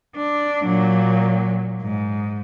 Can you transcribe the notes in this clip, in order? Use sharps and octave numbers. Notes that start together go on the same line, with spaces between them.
D4
A#2 F#3
G#2